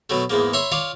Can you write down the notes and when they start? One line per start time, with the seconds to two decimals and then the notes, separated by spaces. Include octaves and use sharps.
0.10 B2 F#3 A3
0.30 E2 G#2 A#3
0.53 C#5 E5 B5 C6
0.72 F4 C#5 D5 F5